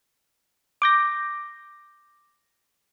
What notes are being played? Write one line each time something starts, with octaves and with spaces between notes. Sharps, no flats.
D6 G6 A#6